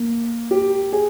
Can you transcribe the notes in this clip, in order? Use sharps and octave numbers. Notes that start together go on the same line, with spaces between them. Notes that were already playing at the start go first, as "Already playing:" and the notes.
Already playing: A#3
G4
G#4